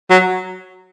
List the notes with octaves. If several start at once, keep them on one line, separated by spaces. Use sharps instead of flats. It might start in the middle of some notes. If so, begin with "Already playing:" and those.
F#3